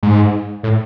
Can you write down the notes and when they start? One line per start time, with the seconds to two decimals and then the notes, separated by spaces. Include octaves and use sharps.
0.03 G#2
0.63 A2